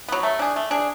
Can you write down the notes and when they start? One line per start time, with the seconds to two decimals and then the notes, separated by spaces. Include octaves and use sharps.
0.09 F#3 B3
0.23 A3
0.39 D4 G#4
0.56 A3
0.71 D4 G#4